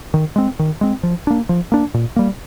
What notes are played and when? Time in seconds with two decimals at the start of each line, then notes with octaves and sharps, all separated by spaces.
0.14 D#3
0.36 G#3 C4
0.59 D#3
0.81 G#3 C4
1.03 F3
1.27 A#3 D4
1.49 F3
1.72 A#3 D4
1.94 A#2
2.16 G3 A#3